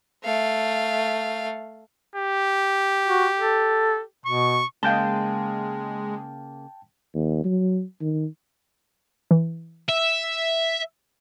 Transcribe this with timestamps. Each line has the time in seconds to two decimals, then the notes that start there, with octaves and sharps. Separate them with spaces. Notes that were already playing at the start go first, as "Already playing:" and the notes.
0.24 A3 F5
2.16 G4
3.06 F#4
3.39 A4
4.26 B2 C#6
4.83 C#3 G#3 A#3 F5 G5 A5 G6 G7
7.14 D#2
7.44 F#3
8.01 D#3
9.31 E3
9.89 E5